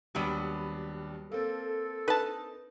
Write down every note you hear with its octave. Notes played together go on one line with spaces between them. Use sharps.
D#2 F#3 G3 B3 D4 D#7
A#3 C4 A4
D#4 B4 A5